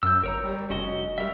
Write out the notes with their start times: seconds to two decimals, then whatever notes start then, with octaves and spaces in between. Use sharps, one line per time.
0.03 F#2 E6 G6
0.24 G1 A#4 C#5 A#5
0.44 G3
0.70 F1 C#4 F#4 D#5
1.18 G3 A#4 E5